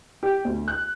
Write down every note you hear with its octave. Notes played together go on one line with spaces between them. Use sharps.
G4
D2
F#6